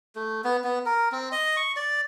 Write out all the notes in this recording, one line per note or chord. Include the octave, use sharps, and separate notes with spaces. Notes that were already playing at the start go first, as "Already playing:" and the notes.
A3
B3
B3
A#4
C4
D#5
C#6
D5